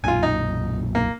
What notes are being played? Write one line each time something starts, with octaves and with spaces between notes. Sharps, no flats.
B1 F#2 A#2 F4 G#5
D#4
A#3